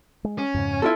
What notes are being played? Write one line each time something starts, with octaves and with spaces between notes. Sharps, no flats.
G#3
C#4
F2 G#2 C#3
B3 E4 F4 A4